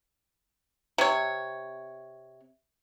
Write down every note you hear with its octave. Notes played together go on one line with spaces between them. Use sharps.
C3 C#5